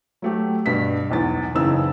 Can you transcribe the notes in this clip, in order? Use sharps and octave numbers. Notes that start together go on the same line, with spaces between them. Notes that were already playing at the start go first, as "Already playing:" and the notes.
F#3 A3 G4
G2 B2 B6
B1 E2 A6
F#1 C#3 E3 D#4 E6